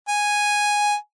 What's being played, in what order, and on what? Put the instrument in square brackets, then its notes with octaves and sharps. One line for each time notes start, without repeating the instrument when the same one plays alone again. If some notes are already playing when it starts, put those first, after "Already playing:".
[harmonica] G#5